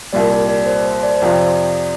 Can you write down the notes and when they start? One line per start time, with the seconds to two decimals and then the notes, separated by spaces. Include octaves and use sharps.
0.13 C2 A#2 G3 D5
0.31 D5
0.49 D5
0.66 C5
0.85 C5
1.03 D5
1.14 C5
1.22 F2 C3 F3 C4 F4 D5